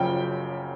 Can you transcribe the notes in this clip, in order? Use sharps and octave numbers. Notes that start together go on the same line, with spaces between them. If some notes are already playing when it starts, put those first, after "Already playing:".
Already playing: F#1 F#2 C#3 F3 G5